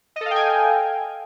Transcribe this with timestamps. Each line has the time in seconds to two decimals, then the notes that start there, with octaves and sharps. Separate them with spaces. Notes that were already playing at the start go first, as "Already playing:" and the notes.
0.16 D#5
0.21 A4
0.26 F5
0.31 G5
0.36 G#5